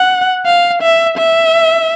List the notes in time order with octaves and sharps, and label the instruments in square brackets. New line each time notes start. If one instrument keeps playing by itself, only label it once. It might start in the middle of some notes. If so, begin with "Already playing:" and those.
Already playing: [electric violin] F#5
F5
E5
E5